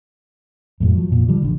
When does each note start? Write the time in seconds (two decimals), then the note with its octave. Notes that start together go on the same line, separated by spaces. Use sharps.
0.80 F2 A2 F#3
0.94 F3 F#3
1.08 F2 A#2
1.28 D3 F3 G3
1.42 A1 D3